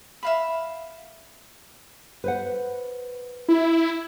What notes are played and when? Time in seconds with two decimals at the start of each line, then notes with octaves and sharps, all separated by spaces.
0.23 E5 F5 B5
2.24 B4 C5 F#5
3.49 E4